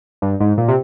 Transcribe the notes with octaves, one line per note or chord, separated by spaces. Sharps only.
G2
G#2
A#2
C3